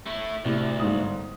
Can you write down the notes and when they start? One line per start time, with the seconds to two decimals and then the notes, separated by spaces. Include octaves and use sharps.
0.06 A3 E4
0.45 D2 A2 C3
0.80 G1 G#2 D#6